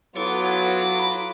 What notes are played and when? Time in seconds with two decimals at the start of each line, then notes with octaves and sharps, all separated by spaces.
0.16 F#3 B3 E4 F4 A4 C#5 D6
0.98 B5